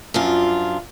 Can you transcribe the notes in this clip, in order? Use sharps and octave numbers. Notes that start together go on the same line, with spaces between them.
F#2 F3 D4 F4